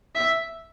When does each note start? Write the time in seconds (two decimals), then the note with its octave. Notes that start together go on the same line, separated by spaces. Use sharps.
0.15 E5